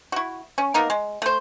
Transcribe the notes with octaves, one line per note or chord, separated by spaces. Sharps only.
E4 F#4
C#4
A#3 B3 D#4 A#4
G#3
A3 C5